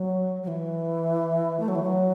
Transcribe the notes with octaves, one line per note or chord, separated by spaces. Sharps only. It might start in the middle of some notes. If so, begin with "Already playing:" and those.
Already playing: F#3
F#3
E3
A3
F#3
E3
F#3